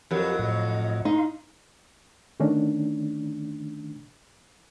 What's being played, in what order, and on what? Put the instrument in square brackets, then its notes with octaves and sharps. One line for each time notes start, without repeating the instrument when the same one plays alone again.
[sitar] F2 F#3 [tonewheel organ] G4 A#4
[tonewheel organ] A2 D#5
[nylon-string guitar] D#4 [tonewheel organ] F5 C6
[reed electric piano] D3 D#3 A3 C#4 D4